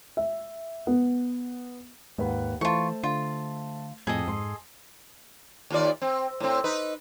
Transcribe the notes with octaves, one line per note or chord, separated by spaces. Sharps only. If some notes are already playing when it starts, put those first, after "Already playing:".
E5
B3
D#2 G#2 B4 F#5
E3 A3 F4 C5 A5 C#6
D3 F4
F2 A2 G#4 A4 D#5
G#2 C6
D#2 F4 D5
C4
A2 C4
D#4 B4